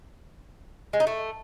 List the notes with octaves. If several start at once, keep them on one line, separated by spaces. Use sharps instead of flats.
G#3
D#4
A3